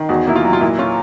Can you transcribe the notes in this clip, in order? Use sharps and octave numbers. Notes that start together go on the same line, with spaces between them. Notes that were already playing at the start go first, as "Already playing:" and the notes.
Already playing: D#3
E2 F#4
A#3 E4
F4
F#3
F4
A#2 E4
C#4 F4